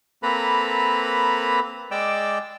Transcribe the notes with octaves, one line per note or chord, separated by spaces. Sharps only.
A#3 C4 A4 B4 A#5 B5
G#3 D5 G5 D6 E6